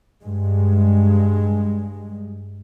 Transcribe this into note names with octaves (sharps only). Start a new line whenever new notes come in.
G2 G#3